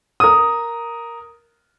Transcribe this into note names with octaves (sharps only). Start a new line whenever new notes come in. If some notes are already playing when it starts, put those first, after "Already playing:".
A#4 D#6